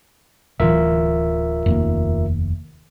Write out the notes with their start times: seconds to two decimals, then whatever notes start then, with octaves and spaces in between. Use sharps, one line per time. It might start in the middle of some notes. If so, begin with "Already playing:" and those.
0.60 D1 E3 F4 A#4 E5
1.66 F1 D#2 A#3